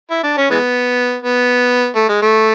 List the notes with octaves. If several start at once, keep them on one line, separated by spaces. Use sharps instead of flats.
E4
D4
C#4
E3 G#3 B3
B3
A3
G#3
A3